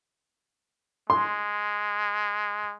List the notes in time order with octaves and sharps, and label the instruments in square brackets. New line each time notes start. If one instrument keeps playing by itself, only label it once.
[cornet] G#3 [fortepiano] C6